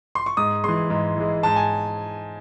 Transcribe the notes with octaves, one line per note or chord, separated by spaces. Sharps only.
C6
C#6
G#2 D#6
E3 G#3 C6
G#2
E3 G#3
G#2 A5
G#5